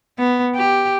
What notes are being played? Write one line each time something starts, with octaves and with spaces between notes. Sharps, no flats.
B3
G4